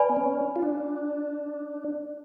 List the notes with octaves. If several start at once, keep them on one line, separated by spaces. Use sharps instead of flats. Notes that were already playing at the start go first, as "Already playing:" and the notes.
Already playing: B4 D5 G#5 B5
B3
C#4
F4
D4